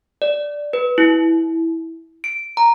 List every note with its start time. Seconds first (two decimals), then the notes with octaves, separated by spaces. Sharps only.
0.22 D5
0.73 B4
0.98 E4
2.24 D7
2.57 A#5